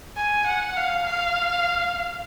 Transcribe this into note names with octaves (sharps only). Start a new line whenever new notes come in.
G#5
F#5
F5
F5